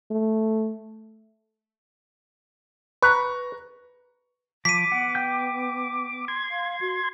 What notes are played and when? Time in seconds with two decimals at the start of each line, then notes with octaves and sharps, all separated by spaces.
0.11 A3
3.02 B4 A#5 C#6
4.65 F3 D6 B6 D#7
4.92 B3 F#5
5.15 G5 G6
6.28 C6 G#6
6.51 F5
6.81 F#4